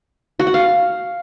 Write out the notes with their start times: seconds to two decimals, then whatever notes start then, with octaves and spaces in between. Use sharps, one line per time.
0.40 F#4
0.47 F#5
0.54 F5